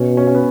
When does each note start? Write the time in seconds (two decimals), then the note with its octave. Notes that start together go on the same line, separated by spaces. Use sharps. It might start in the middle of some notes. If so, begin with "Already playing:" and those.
Already playing: B2 C#4
0.17 C#4
0.27 C#4
0.35 B3